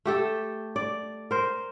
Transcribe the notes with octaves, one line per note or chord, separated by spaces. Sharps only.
A3 G4 A4
D5
A#4 C5